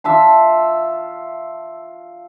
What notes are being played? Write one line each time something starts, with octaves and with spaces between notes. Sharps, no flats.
F4 E5 A5 C6